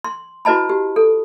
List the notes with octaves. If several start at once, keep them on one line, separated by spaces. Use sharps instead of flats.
C6
E4 F#4 B4 D#5 A5 B5
G4
A4